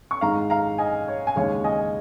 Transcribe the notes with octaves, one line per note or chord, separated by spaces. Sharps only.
C#6
G#2 D#3 G#3 F5 A#5
F5 A#5
D#5 G#5
C#5
G#5
D#2 C#3 G#3 C#5 F5
D#5 G#5